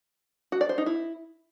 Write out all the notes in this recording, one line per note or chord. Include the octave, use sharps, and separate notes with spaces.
F#4
D5
C5
D#4
E4